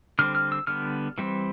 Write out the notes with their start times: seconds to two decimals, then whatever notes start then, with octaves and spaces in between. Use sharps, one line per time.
0.19 D3 G3 C4 F6
0.35 F6
0.52 E6
0.67 D3 G3 B3 F6
1.18 E3 G3 C4